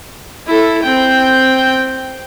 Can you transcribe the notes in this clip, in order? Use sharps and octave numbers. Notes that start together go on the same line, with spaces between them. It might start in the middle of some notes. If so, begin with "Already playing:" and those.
E4 A4
C4 G5